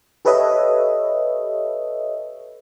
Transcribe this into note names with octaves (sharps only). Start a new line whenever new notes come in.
G4 A4 B4 C#5 D#5 E5